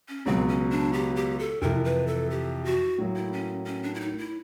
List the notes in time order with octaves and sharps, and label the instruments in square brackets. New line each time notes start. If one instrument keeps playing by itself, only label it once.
[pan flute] C#4
[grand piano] C#2 B2 F#3 [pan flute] C4
[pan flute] C#4
D4
G4
G4
A4
[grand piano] F2 C3 E3 [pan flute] A#4
[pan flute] B4
A4
G4
F#4
[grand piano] A2 F#3 A#3
[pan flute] E4
C#4
C#4
D4
E4
D#4
E4